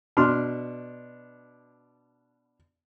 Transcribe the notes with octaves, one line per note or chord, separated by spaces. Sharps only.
B2 D4 C6 F6